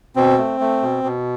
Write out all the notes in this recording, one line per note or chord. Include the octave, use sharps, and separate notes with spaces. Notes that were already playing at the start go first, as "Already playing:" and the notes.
B2 C4
A3
A3
B2
B2